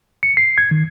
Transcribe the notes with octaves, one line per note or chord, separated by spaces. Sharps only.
C#7
C7
G#6
D#3